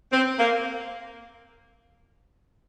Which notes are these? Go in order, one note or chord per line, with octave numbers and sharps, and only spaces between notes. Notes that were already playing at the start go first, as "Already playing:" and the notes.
C4
A#3